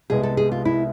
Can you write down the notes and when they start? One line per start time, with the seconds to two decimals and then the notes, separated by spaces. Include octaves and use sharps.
0.10 C2 C3 G#3 B3 G#4
0.23 A4
0.37 G#4
0.52 F4
0.65 E4